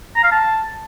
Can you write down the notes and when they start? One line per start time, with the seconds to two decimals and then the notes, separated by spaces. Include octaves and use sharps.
0.16 A#5
0.24 F5
0.31 A5